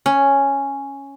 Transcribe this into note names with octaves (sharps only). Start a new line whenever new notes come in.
C#4